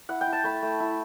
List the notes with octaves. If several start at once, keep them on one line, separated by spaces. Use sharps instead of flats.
E4 F#5
G5
E4
A5
A3 B5
A3
E4